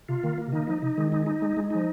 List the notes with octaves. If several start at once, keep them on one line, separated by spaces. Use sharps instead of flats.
C3 F4
D#3 A#3
A#3
C3
D#3 D#4
F3 D#4
C3 D#4
D#3 G#3
D#4
D#4
G#3
G#3
F3 D#4